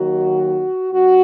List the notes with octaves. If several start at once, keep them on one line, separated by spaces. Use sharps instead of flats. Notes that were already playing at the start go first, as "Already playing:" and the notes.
Already playing: D#2 D#3 F#3 F#4
F#2 F#4